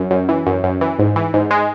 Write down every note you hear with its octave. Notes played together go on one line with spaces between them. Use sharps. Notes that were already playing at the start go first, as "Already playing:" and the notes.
Already playing: F#2
F#2
E3
F#2
F#2
E3
G#2
E3
G#2
G#3